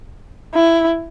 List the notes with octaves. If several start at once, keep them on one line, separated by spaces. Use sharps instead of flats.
E4